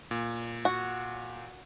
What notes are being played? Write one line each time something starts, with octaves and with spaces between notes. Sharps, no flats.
A#2
F#4